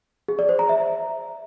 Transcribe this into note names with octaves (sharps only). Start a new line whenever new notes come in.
G#4
D5
C5
A#5
E5